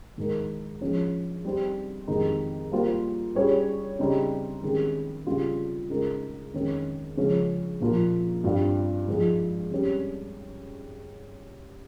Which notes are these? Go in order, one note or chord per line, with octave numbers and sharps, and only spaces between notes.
G#2 D#3 G#3 D#4 A#4
F3 G#3 C#4
G3 C4 D#4 G4 C5
F2 C3 D#3 G#3 D#4
G3 A#3 F4 C5
G3 C#4 G#4 C#5
C#3 G3 C4 D#4
C3 D#3 G#3 C#4 G#4
C#3 G3 C4 F4
C#3 G#3 D#4 A#4
F2 D#3 G#3 C#4
C#3 F3 G#3 C#4
A#2 F3 A#3 F4
G2 G3 C4 F4
G#2 F3 G#3
C3 G3 C#4 G4